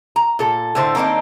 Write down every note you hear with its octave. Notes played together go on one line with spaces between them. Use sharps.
A#5
A#2 A4
A2 D3 C5
D#3 A#3 C4 D4 D#4